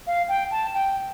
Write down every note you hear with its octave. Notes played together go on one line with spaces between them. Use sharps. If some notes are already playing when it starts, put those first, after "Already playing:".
F5
G5
A5
G5